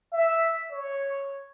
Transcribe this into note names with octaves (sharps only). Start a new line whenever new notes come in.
E5
C#5